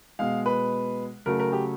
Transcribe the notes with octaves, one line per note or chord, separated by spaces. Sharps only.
B2 G#3 F5
B4
C#3 F#3 A3 A#4
A#4
G4